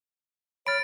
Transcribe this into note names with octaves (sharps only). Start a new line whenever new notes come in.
C#5 B5 F6 A6 D7